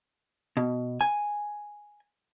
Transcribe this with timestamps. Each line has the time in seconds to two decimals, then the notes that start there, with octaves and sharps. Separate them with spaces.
0.57 B2
1.01 G#5